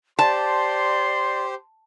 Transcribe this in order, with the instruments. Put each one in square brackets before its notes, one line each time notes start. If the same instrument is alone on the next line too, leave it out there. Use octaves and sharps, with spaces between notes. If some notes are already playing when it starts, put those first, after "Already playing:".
[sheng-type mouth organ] G4 C5 [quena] D5 [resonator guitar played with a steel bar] A5 [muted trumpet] C6